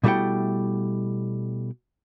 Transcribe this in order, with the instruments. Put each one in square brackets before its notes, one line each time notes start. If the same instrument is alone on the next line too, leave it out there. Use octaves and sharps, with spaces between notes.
[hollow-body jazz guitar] B2 G3 A3 E4 F#5 G5